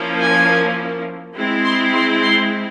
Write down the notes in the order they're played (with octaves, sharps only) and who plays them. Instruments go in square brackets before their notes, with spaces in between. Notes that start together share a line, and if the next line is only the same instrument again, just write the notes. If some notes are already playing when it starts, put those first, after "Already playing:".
Already playing: [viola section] F3 A#3 C#4 E4
G#5
G#3 C4 E4
C6
C6
C6